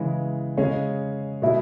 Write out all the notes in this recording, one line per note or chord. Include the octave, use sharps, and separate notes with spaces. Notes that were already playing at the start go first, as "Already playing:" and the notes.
Already playing: C#3 E3 G#3
C#3 G#3 C#4 G#4 C#5
B2 G#3 E4